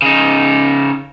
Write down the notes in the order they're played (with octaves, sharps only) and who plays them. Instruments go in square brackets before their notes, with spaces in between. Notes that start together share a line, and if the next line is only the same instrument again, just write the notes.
[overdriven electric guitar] C#3 D#4